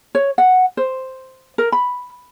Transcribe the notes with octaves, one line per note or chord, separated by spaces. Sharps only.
C#5
F#5
C5
A#4
B5